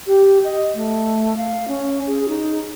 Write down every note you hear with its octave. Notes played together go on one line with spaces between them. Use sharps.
G4
D#5
A3
F5
C#4
G#4
D#4